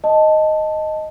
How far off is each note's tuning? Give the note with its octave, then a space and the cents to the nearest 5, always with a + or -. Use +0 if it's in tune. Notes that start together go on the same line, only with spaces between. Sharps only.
D#5 +0 A5 +0